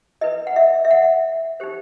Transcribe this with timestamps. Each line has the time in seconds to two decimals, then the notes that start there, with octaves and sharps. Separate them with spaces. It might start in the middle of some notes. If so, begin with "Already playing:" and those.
0.21 E4 B4 D#5
0.47 F#5
0.56 E5
0.85 E5
0.91 F#5
1.60 D#4 G4 C5